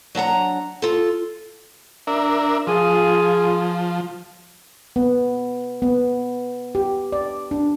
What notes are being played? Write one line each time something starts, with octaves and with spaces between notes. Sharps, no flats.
F#3 D4 F#5 A#5
F4 A4
D4 A#4 E5
F3 F4 G#4
B3
B3
G4
D5
D4